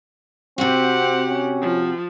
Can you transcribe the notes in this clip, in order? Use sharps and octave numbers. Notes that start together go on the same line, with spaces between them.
C3 C4 F#4 G4 F#5
C#4
F3